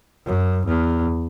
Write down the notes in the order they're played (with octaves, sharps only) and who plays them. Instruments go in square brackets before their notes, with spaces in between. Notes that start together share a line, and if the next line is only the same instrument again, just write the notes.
[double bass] F#2
E2